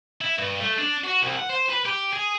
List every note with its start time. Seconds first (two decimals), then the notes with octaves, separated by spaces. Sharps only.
0.21 E4
0.38 G2
0.61 A3
0.79 D4
1.04 F#4
1.23 C2
1.37 F#5
1.50 C5
1.70 B4
1.86 G4
2.13 G#4